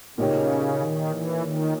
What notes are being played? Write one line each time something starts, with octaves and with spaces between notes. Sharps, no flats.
A#2 C#3 A#3 D#4 G4 C#5
D#3
E3
D#3